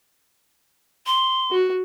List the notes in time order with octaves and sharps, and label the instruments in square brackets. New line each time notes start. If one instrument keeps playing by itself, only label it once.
[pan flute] C6
[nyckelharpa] F#4